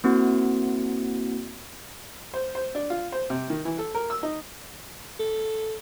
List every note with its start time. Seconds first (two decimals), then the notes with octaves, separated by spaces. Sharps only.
0.04 A#3 C4 E4 F#4
2.34 C5
2.55 C5
2.75 D4
2.90 F4
3.12 C5
3.30 C3
3.50 D#3
3.65 E3
3.78 A4
3.95 A#4
4.10 E6
4.23 D#4
5.19 A4